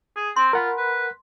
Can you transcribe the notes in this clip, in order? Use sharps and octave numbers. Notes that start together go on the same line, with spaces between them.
G#4
C4 C6
F4 A#4 F#5 B5
B4